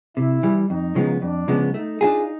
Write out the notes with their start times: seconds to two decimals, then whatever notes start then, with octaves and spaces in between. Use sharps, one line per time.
0.17 C3 E4
0.43 E3 G3
0.69 F2 D#4
0.95 C#3 F3 G#3 B3
1.22 F2 D4
1.48 C#3 F3 G#3 B3
1.74 A3 D#4
2.01 D4 F4 G#4